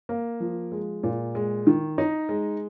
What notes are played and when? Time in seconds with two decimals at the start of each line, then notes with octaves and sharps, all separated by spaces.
0.09 A#3
0.40 F3
0.72 G#3
1.03 A#2
1.35 G#3
1.67 D#3
1.98 D#4
2.29 G#3